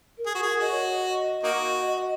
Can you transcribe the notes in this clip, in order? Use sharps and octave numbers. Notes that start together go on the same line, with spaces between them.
A#4
G#4
F#4
G#4
F#4 D#5
C#5
D#5
A#3 D#4 F#4
D#5
D#5